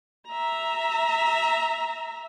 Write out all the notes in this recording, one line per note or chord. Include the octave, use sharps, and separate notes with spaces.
E5 A#5